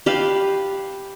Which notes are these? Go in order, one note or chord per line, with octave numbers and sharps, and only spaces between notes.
G4 B4 F5 A5